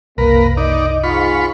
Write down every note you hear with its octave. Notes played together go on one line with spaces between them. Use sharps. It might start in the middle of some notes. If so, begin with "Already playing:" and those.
F#1 C2 A#3 A#4 B4
D#4 D5 D#5
G#2 F4 B5 C#6